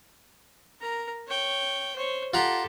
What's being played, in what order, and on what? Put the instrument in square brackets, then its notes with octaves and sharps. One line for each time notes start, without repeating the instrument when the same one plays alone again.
[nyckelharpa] A#4 A#5
C#5 G5
C5 C#5
[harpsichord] F4 F#5 A#5 [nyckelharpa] G4 A4